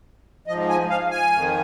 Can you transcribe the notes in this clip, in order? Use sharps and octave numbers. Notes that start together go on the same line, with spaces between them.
G#2 F3 D#5
G#5
F5
G#5
F2 D#3